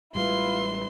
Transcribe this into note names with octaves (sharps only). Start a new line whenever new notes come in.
A1 G3 G#3 E4 F4 B4 C6